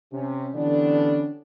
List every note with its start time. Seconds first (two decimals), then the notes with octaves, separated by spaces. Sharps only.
0.13 C3 C#4
0.54 D3 E3 G3 B3 C#4 D4